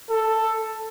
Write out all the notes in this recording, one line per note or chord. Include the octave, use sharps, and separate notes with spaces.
A4